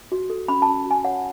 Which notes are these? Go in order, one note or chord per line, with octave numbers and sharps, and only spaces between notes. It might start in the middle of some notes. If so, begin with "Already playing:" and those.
F#4
A4
C#4 B5
A5
C#4
F#4 G#5
C#5 F#5